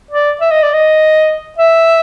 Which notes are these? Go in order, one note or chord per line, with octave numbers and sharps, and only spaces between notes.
D5
E5
D#5
D5
D#5
E5